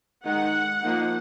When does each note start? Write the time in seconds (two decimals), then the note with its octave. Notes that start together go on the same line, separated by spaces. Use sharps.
0.24 D#3 G#3 D#4 F#5
0.82 F3 A#3 D#4